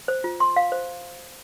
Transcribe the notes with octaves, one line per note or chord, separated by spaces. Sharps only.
C5
F4
C6
F5
C5